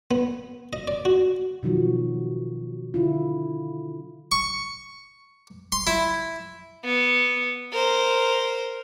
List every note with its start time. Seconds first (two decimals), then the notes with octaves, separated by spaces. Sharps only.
0.11 B3
0.73 D#5
0.88 D5
1.05 F#4
1.63 B2 D#3 F3 F#3 F#4
2.94 D3 E4 F4
4.32 C#6
5.72 C6
5.87 E4
6.84 B3
7.72 A#4 C5